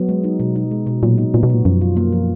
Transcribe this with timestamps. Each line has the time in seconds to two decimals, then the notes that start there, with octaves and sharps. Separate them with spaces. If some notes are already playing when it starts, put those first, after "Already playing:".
Already playing: F#3 B3
0.09 G#3
0.24 D#4
0.40 B2
0.56 D#4
0.71 G#3
0.87 B2
1.03 A#2 F#3
1.18 D#4
1.34 A#2 B3
1.43 B2
1.50 A#2 F#4
1.65 F#2 F3
1.81 F4
1.97 A#3
2.13 F3